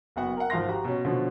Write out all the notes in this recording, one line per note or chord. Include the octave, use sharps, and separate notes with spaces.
F#1 B3 F#4 F#5
A#4 F#5
G#1 F3 F5 C6 A#6
F#4 G4 A#5
B2 C#4
B2 D3 F3 C#4